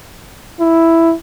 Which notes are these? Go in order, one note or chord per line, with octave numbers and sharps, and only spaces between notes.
E4